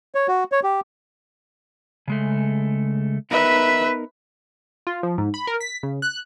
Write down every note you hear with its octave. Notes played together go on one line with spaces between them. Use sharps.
C#5
F#4
C#5
G4
C#3 G#3 A3
B3 D#4 A#4 B4 E5
F4
F3
G#2
B5
A#4
B6
C#3
F#6